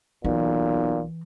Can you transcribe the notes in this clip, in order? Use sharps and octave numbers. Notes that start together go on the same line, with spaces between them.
B1 A#2 E3